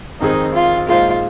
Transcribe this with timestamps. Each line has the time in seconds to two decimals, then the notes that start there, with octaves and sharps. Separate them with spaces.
0.21 F2 D#3 G#3 C4 D#4 G#4
0.54 F4
0.88 A#2 G#3 D#4 F4 C5